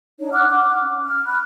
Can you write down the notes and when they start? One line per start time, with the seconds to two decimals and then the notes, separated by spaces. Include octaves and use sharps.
0.19 D4 D#4 C#5
0.33 F#5 D6 F6 F#6
0.49 F#5 D6
0.82 C#4
1.05 F6
1.27 B5 F#6